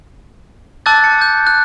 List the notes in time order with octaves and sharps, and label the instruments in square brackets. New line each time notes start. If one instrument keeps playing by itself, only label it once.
[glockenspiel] A5 D6 E6 F#6 G6 A6
C#7
G6
F#6